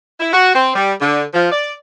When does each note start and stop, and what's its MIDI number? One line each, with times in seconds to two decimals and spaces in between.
0.20 0.30 64
0.33 0.52 66
0.54 0.72 60
0.76 0.92 55
1.01 1.24 50
1.34 1.51 53
1.52 1.72 74